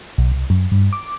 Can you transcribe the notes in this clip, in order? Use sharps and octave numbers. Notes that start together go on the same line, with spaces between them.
B1
C2
F#2
G2
D6